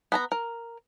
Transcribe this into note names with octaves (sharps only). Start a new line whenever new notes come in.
B3 A5 A#5
A#4